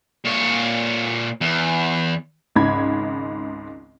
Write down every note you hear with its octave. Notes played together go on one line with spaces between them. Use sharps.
A#2 C#5
E2
G#1 C#2 G#2 B5 G#6